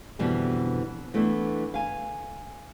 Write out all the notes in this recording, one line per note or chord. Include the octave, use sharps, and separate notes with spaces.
F2 B2 D3 E3 G3 E4
E3 A3 B3 D4 E4
F5 G#5